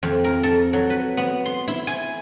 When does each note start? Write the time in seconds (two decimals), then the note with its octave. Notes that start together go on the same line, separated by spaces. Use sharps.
0.03 F2
0.24 A#4
0.43 A4
0.73 F#3
0.90 B4
1.17 B3
1.45 C6
1.68 E4
1.87 G#5